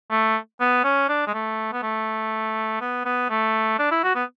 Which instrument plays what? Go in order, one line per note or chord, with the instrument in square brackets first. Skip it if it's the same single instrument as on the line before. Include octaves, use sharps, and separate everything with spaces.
[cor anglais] A3
B3
C#4
D4
G#3
A3
B3
A3
B3
B3
A3
D4
E4
F#4
B3